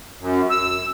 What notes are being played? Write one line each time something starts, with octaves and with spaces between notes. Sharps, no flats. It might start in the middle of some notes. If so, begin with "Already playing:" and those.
F#2
E6